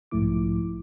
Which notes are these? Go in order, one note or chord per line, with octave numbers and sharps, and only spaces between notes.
B1 G#2 F3 A3 E4 D6